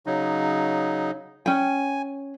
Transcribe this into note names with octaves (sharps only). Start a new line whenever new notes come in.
C#3 F#3 D#4
C#4 G5 G#5